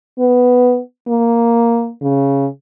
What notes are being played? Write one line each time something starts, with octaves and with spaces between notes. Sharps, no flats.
B3
A#3
C#3